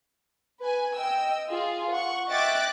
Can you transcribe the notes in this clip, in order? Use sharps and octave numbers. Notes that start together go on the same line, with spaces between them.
B4 G#5
D#5 G5 E6
F4 G#4
F#5 C#6
D#5 E5 G5 D6 F#6 A6